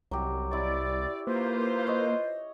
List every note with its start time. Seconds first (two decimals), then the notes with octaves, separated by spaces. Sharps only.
0.11 C2 F#3 G4
0.51 E4 C#5 D5
1.27 A#3 F4 B4 C5
1.87 C#5 D#5